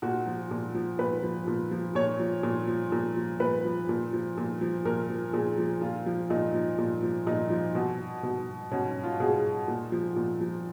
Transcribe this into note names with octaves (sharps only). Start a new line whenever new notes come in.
A#2 F#4
F3
A#2
F3
A#2 B4
F3
A#2
F3
A#2 C#5
F3
A#2
F3
A#2
F3
A#2 B4
F3
A#2
F3
A#2
F3
A#2 A#4
F3
A#2 G#4
F3
A#2 F4
F3
A#2 D#4
F3
A#2
F3
A#2 D#4
F3
B2
B2
B2 C#4
F4
B2 G#4
A#2
F3
A#2
F3